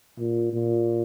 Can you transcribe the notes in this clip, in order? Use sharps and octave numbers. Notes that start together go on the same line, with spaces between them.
A#2
A#2